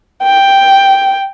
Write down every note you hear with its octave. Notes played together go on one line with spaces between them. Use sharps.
G5